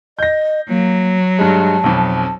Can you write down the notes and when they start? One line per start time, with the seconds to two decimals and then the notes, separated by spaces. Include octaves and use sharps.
0.19 D#5 G6 A#6
0.68 F#3 A#3
1.39 G2 G#3 A5
1.84 B1 F2